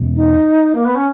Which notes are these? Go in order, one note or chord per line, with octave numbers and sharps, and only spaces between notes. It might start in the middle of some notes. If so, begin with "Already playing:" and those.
Already playing: E2 B2 G#3 C#4
D#4
A#3
B3
C#4